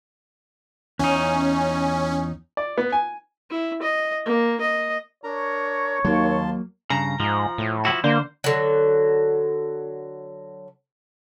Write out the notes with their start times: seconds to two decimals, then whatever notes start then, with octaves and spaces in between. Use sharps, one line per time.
0.99 E2 C#4 D#4
2.57 D5
2.78 B3
2.92 G#5
3.50 E4
3.82 D#5
4.26 A#3
4.61 D#5
5.24 D4 A#4 C#5 A#5
6.05 D#2 F#3 A#3 A5 C6
6.90 G2 C#3 A#5
7.20 G#2 F3
7.58 A2
7.85 F3 E4 F#4
8.04 D3 A#3 C5
8.44 D3 F#3